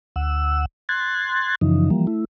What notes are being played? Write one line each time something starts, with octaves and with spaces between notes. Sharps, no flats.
D2 F#5 E6
C6 F#6 G#6 A6
F#2 C#3 E3 F3 D#4
E3 F3 G3 A#3
A3 E4